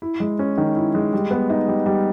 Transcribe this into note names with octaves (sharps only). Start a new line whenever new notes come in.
E4
G#3
C#4
D#3
E4
G#3
G3
B3
D#4
G3
G3